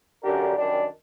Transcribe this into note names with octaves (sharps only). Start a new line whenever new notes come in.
F#2 D3 D4 G4 A#4
F#2 D#3 G3 D4